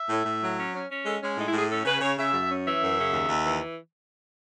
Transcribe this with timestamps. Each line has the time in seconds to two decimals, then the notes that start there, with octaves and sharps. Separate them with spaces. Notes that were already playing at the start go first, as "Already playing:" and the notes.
Already playing: E5
0.09 A2
0.26 A2
0.42 F#3
0.58 C#4
0.73 C#4
0.90 C#4
1.05 G#3 A4
1.21 G#3 C#4
1.37 A2 D#4
1.47 E4
1.52 A2
1.58 G#4
1.69 C#4 A4
1.85 C#3 B4
2.01 C#3 C#5
2.17 C#3 E5
2.34 F#2
2.49 C#4
2.65 E3 E5
2.81 F#2
2.97 C#3
3.12 D#2
3.29 D#2
3.44 E3